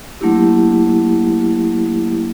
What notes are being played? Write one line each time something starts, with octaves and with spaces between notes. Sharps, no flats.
F#3 A3 A#3 D4 E4 G4